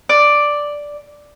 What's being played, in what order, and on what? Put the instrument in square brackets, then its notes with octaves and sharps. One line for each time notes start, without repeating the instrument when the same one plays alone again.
[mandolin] D5